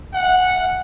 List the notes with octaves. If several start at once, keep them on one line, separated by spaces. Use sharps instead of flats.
F#5